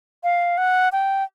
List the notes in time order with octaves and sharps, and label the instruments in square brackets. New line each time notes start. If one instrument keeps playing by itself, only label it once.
[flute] F5
F#5
G5